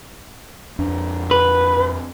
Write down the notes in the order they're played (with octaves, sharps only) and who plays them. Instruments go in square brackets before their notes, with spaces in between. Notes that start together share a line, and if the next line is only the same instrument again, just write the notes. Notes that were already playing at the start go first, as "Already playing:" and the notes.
[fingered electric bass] F2 D4
[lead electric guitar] B4